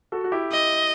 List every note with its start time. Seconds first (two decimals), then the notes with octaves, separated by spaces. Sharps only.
0.12 F#4 A4
0.24 F#4
0.32 E4 G4
0.52 D#5